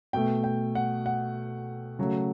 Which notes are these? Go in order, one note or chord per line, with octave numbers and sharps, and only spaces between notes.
B2 A3 G5
G5
F#5
F#5
C#3 F#3 A3